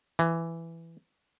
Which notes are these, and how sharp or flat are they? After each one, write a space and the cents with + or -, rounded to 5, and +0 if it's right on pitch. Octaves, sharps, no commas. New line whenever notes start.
E3 +10